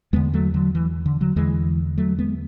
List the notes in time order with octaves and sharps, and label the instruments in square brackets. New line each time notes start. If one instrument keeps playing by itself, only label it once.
[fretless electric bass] E2 D3 G#3 B3
F#3 A3
D3 F#3
E3
D3
D3 F#3
E2 D3 E3 G#3
F#3 A3
G#3 B3